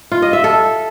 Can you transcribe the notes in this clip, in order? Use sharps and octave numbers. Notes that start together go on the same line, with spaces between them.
F4
D#5
E5
A4